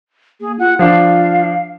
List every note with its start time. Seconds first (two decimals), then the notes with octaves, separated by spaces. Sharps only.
0.41 A#3 G#4
0.59 F4 F#5
0.79 F3 D4 F4 F5